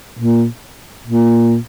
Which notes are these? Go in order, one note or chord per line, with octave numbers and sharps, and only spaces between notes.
A#2
A#2